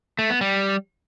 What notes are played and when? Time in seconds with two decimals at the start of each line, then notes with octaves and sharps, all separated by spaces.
0.19 A3
0.30 B3
0.41 G3